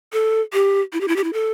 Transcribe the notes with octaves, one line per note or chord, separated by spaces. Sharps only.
A4
G4
E4
G4
E4
G4
E4
A4